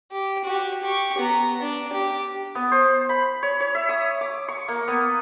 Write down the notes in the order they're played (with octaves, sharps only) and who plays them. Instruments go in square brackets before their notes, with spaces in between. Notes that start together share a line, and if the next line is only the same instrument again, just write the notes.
[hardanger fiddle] G4
F#4 G4
G4 C#6
B3 A#5
D4
G4
[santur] B3
C5
B5
C#5
C#5
E5
D#6
D6
C#6
A#3
B3